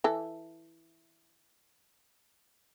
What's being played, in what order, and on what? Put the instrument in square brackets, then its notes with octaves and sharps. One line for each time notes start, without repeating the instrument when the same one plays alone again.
[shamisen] E3 A4